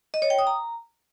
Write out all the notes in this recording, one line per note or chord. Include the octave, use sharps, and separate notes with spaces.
D#5
C#5
G5
D#6
A#5